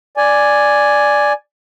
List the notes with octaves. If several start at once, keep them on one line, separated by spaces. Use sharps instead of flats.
D5 G#5